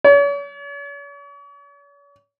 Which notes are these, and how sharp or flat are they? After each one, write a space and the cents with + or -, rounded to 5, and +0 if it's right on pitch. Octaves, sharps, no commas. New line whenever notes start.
C#5 +40